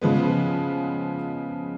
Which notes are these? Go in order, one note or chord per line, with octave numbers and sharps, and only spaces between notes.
C#3 F3 G#3 B3